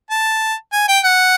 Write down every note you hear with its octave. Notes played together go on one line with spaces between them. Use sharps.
A5
G#5
G5
F#5